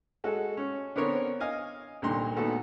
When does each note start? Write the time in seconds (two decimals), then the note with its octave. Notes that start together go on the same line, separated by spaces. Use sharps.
0.24 G#3 F#4 A4
0.57 C#4
0.96 D3 B3 C4 A#4 C#5
1.40 D#5 F5 G#5
2.02 C2 A#2 D3 D#3 A#5 C6
2.36 A#2 D#3 A3 B3 F#4 A4